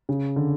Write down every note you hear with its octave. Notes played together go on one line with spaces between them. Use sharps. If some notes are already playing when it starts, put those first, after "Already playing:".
C#3
D3